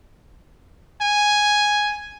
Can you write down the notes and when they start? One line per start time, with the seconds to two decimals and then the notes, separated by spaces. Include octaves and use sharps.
1.01 G#5